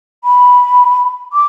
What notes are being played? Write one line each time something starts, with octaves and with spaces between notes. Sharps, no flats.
B5
D6